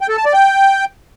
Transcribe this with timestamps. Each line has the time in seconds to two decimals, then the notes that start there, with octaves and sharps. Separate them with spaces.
0.01 G5
0.09 A4
0.17 A5
0.25 D5
0.34 G5